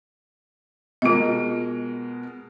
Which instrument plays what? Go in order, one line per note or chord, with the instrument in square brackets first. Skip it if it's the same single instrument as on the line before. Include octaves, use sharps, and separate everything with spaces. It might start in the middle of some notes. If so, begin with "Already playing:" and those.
[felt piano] B2 G#3 A#4 [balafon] F4 D#5